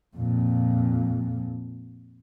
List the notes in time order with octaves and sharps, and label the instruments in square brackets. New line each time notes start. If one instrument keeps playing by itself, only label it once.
[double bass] F2 A#2